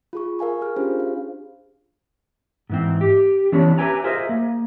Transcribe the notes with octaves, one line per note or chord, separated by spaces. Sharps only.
F4 G#4 C#6
A#4 F5 G#5 C#6
G#4 F5 F6
C#4 D4 F4 G4 G#4 C5
F5
G#2 E3 C4
G4
E3 B3 C#4 D4 C#5
G4 B4 E5 G5 G#5 A#5
F4 G#4 A#4 C5 D#5 E5
A#3